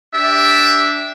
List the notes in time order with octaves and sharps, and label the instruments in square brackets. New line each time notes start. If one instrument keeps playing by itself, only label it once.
[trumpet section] D4 G4 D5 E5